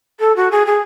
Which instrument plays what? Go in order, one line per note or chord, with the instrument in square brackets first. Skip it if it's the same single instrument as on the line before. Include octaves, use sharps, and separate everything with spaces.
[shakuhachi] A4
F#4
G#4
G#4